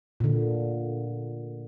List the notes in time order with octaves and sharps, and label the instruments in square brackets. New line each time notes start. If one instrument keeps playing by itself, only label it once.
[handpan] A#2 D3